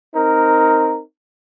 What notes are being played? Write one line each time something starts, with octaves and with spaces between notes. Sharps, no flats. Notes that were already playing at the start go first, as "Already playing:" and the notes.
C4 D#4 A#4